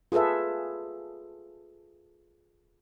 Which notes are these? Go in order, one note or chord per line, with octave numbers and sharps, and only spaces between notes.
F4 G#4 A4 B4 E5